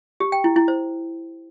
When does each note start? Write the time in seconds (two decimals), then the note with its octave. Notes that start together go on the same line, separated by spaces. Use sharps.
0.20 G4
0.32 G5
0.44 E4
0.56 E4
0.68 C5